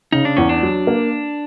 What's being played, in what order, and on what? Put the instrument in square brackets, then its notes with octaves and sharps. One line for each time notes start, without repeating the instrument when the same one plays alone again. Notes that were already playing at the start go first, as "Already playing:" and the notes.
[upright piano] C#3 [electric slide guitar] D#4
[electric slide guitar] D4
[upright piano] E2 [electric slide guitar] C#4
[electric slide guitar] D4
[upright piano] F#3
A#3